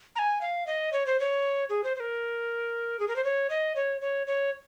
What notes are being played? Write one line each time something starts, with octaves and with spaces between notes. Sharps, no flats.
A#5
G#5
F5
D#5
C#5
C5
C#5
G#4
C5
C5
A#4
G#4
A#4
C5
C#5
D#5
C#5
C#5
C#5